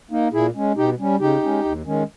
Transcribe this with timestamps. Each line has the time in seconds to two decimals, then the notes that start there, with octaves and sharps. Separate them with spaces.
0.11 A#3 D#4
0.33 A#2 E4 G#4
0.55 G#3 C#4
0.77 B2 D#4 G4
0.99 G3 C#4
1.20 C#3 D#4 G4
1.43 G#3 C#4
1.65 D#2
1.86 D#3 G#3 C#4